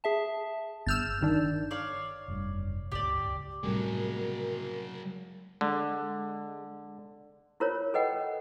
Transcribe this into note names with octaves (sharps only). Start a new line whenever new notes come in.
G#4 E5 A5
G1 E6 F6 G6 A6 E7
G1 D#3 D4
C#5 D5 F5
F1 G2
D1 G1 C#2 G4 D5
A2 C3 F#3 G3 G#4 A#4
D3 G#3
E4 F4 A#4 C5 C#5
A4 B4 D#5 F#5 G5